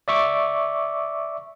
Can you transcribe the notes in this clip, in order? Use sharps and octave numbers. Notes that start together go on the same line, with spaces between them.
D5 E5 C#6 D6